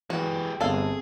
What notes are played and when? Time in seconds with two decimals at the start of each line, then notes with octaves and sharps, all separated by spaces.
0.10 E3 G#3 F#4 G4
0.61 G1 A3 C4 G#4 A4 F5